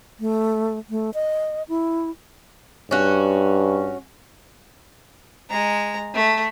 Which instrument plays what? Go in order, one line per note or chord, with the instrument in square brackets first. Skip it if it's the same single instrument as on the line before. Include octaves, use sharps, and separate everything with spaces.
[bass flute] A3
A3
D#5
E4
[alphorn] G2 [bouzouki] C#4 F#4
[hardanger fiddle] G#3 A#5
A3